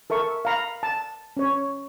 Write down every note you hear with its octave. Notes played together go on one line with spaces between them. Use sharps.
A4 A#4 E5 C#6
F5 A#5 B5
A5
C#4 C#5